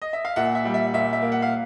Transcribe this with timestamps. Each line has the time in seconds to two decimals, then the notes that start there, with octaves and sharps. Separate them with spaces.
0.02 D#5
0.13 E5
0.25 F5
0.36 A#2 E5 F#5
0.55 E5
0.65 G3
0.74 E5
0.94 A#2 E5
1.13 E5
1.22 A#3
1.32 F#5
1.42 F5